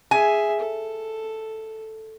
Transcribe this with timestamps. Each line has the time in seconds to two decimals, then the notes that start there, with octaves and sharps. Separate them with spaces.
0.11 G#4 E5 G#5
0.59 A4